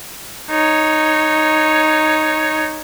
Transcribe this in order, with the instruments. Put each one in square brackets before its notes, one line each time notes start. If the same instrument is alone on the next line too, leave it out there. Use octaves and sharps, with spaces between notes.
[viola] D#4 C#5